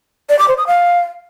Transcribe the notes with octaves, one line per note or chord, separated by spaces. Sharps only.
D5
D6
C5
D#6
F5